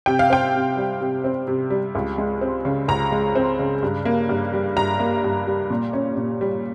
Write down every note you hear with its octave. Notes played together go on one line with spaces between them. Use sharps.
C3 G5
F5
C4 G5
C3
G3
C3
C4
C3
G3
C#2
G#3
C4
C#3
C#2 A#5
G#3
C4
C#3
G2
A#3
G2
G3
G2 A#5
A#3
G2
G3
A#2
C#4
A#2
G3